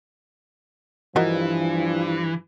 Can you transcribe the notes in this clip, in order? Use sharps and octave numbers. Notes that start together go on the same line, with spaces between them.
G2 E3 F3 F#4 A#4 D#5